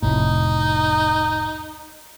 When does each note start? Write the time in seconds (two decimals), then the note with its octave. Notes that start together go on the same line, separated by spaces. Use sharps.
0.02 F1 C2 A2 D#4